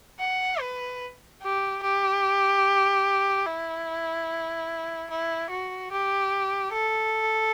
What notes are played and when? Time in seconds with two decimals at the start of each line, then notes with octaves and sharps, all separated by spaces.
0.20 F#5
0.60 B4
1.42 G4
1.83 G4
3.46 E4
5.11 E4
5.51 F#4
5.92 G4
6.73 A4